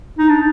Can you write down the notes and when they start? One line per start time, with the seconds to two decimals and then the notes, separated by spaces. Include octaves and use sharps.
0.19 D#4
0.29 D4